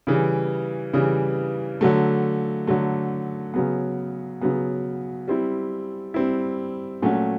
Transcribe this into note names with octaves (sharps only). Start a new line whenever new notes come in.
C#3 E3 G3
C#3 E3 G3
D3 F#3 A3
D3 F#3 A3
C#3 F#3 B3
C#3 F#3 B3
G3 C4 E4
G3 C4 E4
A#2 F#3 A3 C#4 F#4